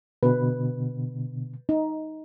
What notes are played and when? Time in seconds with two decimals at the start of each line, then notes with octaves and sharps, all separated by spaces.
0.23 B2 D3 B4
1.69 D#4